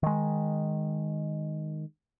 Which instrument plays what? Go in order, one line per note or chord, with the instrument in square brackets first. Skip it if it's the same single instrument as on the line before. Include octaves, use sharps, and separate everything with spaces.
[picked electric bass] D#3 G#3